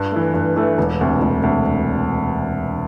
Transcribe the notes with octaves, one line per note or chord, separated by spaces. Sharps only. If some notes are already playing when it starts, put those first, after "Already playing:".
Already playing: G2
E3 A3
G2
E3 A3
E1
D2 C3
E1
D2 C3